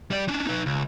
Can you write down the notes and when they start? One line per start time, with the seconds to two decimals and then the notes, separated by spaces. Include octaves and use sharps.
0.11 G3 D5
0.28 C#4 D4
0.47 D#4 B4
0.66 C#2